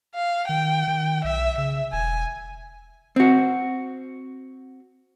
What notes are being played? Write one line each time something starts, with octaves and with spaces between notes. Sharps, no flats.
F5
D#3 G5
D#3
B1 E5
C#3 E5
E1 G#5
C4 F#4